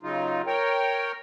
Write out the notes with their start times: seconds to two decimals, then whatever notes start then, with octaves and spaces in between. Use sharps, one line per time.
0.03 C#3 F#3 D#4 F4
0.47 A#4 C#5 G5